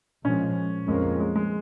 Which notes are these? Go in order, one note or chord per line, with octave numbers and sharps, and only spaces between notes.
A#2 F3 G#3 C#4
F2 F3 G#3 A#3 C#4
G#3
G#3